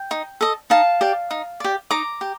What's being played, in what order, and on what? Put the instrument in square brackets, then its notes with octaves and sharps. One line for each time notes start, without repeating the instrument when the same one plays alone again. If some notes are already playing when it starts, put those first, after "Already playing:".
Already playing: [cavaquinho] G5
D#4
A4 D#5
D#4 F5 A5
G4 D5
D#4
G4 D5
D#4 A#5 D6
G4